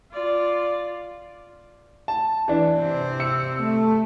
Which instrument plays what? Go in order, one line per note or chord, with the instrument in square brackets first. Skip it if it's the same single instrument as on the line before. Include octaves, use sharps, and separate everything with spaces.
[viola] F4 D5
[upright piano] A5
E3 D4
[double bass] C3 C4
[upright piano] E6 C#7
[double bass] A3